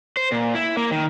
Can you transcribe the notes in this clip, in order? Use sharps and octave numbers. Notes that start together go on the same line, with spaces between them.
C5
A#2
E4
A#3
D#3